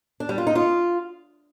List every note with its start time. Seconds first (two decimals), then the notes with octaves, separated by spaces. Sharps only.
0.20 D4
0.29 G3
0.38 F4
0.47 D#4
0.55 F4